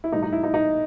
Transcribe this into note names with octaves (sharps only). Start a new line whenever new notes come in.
E4
A2 E3 G3 D#4
D#4
E4
D#4
D#4